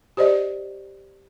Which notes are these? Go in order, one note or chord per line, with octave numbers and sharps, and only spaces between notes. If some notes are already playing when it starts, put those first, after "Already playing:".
G4 C5 D5 D#5